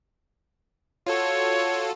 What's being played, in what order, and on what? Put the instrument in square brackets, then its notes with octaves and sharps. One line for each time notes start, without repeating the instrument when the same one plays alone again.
[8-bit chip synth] F4 F#4 A4 [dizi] C#5